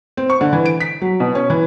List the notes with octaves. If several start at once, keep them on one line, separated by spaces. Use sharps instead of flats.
C4
C#6
D3
E3
D7
B6
F#3
B2
C#4
E3